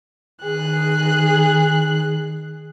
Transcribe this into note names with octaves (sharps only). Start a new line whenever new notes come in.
D#3 G#4 F#6